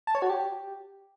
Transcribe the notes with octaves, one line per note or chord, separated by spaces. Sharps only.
A5
C#5
F#4
G4